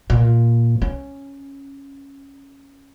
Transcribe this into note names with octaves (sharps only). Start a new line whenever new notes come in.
A#2
C#4